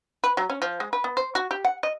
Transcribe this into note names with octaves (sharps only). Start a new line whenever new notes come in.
B4
F#3
C#4
F3
G#3
B4
B3
C5
F#4
G4
F#5
D#5